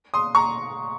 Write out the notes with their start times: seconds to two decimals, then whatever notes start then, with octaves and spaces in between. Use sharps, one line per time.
0.14 C6 D#6
0.35 A#5 C#6